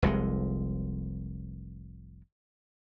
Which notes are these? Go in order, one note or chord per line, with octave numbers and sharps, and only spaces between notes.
F1 C2 F2 G#3